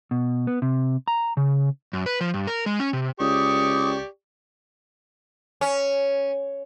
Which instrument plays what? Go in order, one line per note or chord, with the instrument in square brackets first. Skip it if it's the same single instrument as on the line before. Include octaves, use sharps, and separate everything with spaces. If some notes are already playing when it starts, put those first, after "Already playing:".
[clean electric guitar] B2
B3
C3
A#5
C#3
[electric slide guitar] F#2
B4
F3
G2
A#4
G#3
C#4
C3
[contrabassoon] C#2 [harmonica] G4 D5 C#6 [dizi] D#6
[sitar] C#4